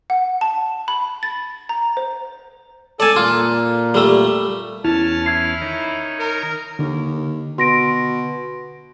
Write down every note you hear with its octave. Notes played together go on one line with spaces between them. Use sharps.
F#5
A5
B5
A6
A#5
C5
A4 D5 G#5 A5
A#2 F4
G3 A3
E2 C#4 E4 A5 F6
E4 G#6 C7
D#3 D#4 C#5
A#4
D#2 D3
B2 C6 A#6 D7